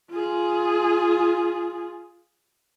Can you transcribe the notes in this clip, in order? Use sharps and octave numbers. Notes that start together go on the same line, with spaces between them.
F4 G#4